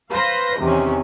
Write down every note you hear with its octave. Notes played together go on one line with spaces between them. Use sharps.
B4 C5 F5 A#6
E2 C3 D#3 C#4